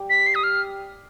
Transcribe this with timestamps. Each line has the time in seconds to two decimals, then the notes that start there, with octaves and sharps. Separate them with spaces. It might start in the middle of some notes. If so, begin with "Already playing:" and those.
Already playing: G3 G4
0.10 B6
0.27 C7
0.35 D#6
0.44 F6